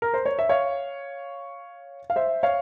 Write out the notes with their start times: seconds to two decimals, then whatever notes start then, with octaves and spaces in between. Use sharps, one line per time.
0.02 A#4
0.14 C5
0.26 C#5
0.39 E5
0.49 C#5 F5
2.10 F5
2.16 C5 E5
2.43 C#5 F5